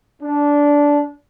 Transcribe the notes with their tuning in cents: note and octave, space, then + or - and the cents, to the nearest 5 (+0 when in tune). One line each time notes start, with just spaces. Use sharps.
D4 -15